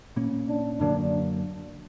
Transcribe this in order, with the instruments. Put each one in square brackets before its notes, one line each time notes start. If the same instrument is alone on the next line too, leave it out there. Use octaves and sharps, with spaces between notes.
[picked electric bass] A#2 A#3 C#4
[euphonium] D4
[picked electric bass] F#2 D3 F#3 A#3 [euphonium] D4